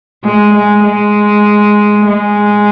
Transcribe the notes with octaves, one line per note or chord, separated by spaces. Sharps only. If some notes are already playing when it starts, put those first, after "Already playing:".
G#3
G#3
G#3
G#3